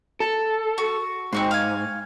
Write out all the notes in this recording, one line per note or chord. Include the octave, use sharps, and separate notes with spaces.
A4
F#4
G#2 C4 F#4 C6
F5 G#5